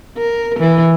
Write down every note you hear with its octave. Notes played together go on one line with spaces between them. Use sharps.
A#4
E3